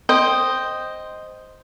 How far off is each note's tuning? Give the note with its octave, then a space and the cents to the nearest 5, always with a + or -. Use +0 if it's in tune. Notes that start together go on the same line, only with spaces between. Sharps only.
C5 +0 D#5 +0 G5 +0